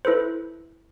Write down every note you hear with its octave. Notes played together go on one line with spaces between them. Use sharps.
E4 A4 B4 C5